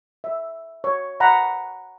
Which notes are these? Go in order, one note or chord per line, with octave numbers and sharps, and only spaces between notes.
E5
C#5
F#5 A#5 B5